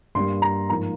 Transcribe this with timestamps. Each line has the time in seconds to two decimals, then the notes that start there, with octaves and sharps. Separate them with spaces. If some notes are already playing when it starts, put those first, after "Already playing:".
0.15 G2 G3 A#3 C6
0.42 A#5
0.70 G#2 F3 A#3 A#5